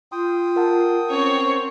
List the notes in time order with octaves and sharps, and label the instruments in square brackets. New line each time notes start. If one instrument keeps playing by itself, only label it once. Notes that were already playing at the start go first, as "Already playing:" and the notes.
[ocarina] F4 [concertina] G5 D#6 [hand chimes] C6
[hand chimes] A#4 F#5 A5
[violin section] C4 C#5 [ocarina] C#4